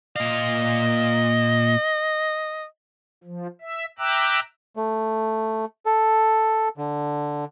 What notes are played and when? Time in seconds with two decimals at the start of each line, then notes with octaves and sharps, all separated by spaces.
0.16 A#2 D#5 F5
3.24 F3
3.61 E5
3.99 E5 G5 A#5 D6 E6 F#6
4.76 A3
5.86 A4
6.77 D3